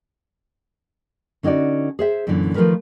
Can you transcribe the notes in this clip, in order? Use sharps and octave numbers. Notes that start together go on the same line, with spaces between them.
D3 C#4 D#4 F#4 D5
G#4 C5 E5
F#2 A#2 D3 E3
D#3 F3 F#3 A3 A#4 B4